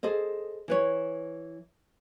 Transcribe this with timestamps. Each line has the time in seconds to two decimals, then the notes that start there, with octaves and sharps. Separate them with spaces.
0.03 G#4 A4 C5 D#5
0.68 E3 B4 C#5